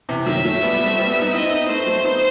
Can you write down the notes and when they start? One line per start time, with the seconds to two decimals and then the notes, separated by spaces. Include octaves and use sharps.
0.09 C3 E3
0.26 D#3 F#3 E5
0.45 F#3 A3
0.62 G3 B3
0.74 G3 B3
0.86 A3 C4
0.98 G3 B3
1.10 G3 B3
1.21 B3 D#4
1.33 C4 E4 D#5
1.51 B3 D#4
1.68 A3 C4 C5
1.86 F#3 A3
2.04 B3 D#4